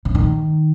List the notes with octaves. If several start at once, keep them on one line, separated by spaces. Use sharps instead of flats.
C#3
D#3